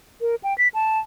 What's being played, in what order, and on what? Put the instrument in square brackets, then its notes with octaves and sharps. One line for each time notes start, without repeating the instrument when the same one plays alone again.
[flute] A#4
G5
B6
A5